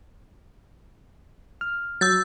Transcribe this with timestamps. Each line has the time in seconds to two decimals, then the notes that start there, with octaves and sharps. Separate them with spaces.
1.61 F6
2.01 F#3 E6 G6 A6